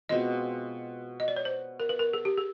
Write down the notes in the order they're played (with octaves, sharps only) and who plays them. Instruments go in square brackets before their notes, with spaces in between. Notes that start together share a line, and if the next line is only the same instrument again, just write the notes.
[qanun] B2 G#3 C4 F4 [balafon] D#5
[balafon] D#5
D5
C#5
C5
A#4
B4
A#4
G#4
G4
G#4